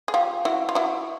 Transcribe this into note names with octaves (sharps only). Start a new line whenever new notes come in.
G#4
F4 G4
E4 F#4
F4
E4 F#4